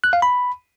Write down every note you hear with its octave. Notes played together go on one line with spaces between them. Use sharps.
F#6
F5
B5